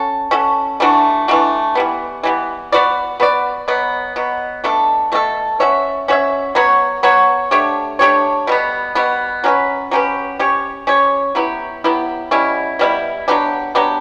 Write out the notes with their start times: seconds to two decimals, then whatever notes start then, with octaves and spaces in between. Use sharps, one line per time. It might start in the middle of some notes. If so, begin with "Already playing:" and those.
Already playing: C#4 F#4 A4
0.31 C#4 F#4 A4
0.80 E3 A3 D4 F#4
1.28 E3 A3 D4 F#4
1.75 E3 G3 B3
2.23 E3 G3 B3
2.72 B3 F#4 B4 D5
3.20 B3 F#4 B4 D5
3.68 B2 F#3 B3
4.16 B2 F#3 B3
4.64 B2 A3 D4 A4
5.12 B2 A3 D4 A4
5.60 C#4 F#4 C#5 E5
6.08 C#4 F#4 C#5 E5
6.55 F#3 B3 F#4 C#5
7.03 F#3 B3 F#4 C#5
7.51 A3 D4 G4 C#5
7.99 A3 D4 G4 C#5
8.47 B2 G3 B3
8.95 B2 G3 B3
9.44 F#3 C#4 G4 B4
9.91 F#3 C#4 G4 B4
10.39 C#4 G4 C#5
10.87 C#4 G4 C#5
11.35 F#3 B3 E4 G4
11.84 F#3 B3 E4 G4
12.31 B2 G3 C#4 E4
12.79 B2 G3 C#4 E4
13.28 F#3 B3 D4 G4
13.75 F#3 B3 D4 G4